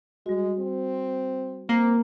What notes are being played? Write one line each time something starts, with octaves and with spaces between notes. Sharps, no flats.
G3 G#3 F#4
C4
A#3 C4